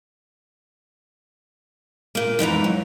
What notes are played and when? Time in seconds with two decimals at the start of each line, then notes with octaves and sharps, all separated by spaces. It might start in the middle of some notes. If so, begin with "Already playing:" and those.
2.15 A#2 A#3
2.39 F2 G#2 E3 A#5
2.64 F#3